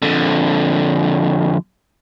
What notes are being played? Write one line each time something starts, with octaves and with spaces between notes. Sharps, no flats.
F2 D3